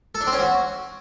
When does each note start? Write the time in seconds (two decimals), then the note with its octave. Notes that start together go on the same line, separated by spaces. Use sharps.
0.15 A4
0.21 D4
0.27 C4
0.33 C#4
0.39 F#4